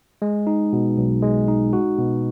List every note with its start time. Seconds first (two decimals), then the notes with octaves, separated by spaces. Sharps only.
0.22 G#3
0.47 D#4
0.73 B2
0.98 B1
1.22 G#3
1.48 D#4
1.73 F#4
1.98 B2